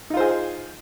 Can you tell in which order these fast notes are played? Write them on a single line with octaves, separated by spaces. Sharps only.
D#4 F4 C5 G#4